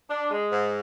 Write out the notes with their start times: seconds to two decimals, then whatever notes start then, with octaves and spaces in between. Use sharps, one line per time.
0.09 D4
0.31 G#3
0.51 G#2